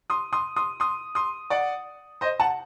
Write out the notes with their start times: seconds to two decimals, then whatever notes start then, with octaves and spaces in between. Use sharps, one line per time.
0.10 C6 D#6
0.33 C6 D#6
0.56 C6 D#6
0.80 C6 D#6
1.15 C6 D#6
1.50 D5 F#5
2.21 C5 D#5
2.40 F#5 A5